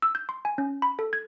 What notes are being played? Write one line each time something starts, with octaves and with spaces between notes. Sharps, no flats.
E6
G6
C6
G#5
C#4
B5
A4
G#6